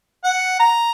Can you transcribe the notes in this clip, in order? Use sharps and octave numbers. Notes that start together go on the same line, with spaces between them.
F#5
A#5